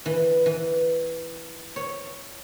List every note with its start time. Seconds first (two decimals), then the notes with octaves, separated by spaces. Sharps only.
0.06 E3
0.46 E3
1.76 C#5